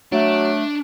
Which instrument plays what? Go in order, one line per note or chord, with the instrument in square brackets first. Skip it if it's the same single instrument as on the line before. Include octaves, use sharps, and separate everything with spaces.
[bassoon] F#3 [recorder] A3 [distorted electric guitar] D4